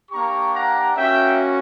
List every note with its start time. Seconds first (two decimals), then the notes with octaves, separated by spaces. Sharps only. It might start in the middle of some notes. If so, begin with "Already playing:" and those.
0.11 A#3 D4 G4 A#5 C#6
0.53 F#5 A#5
0.96 A#3 C#4 F#4 E5 G5